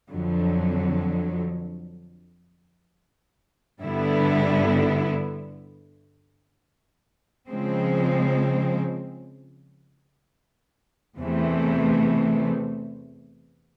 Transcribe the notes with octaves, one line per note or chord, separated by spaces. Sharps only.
F2 D3 F#3
G2 D3 G3 B3 E4
C#3 F3 G#3 C4
E2 C3 E3 A3